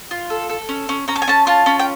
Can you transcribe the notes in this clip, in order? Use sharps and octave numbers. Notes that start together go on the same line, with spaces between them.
F4
A4
A4
C#4
C#4
C#4 A#5
A5
G#5
C#4 A5
F4 A5
C#4
G5